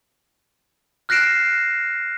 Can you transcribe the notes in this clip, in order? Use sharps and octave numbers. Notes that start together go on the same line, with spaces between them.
F6 F#6 A#6 C7 D7 E7